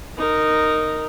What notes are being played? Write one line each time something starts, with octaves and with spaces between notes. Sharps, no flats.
D#4 A#4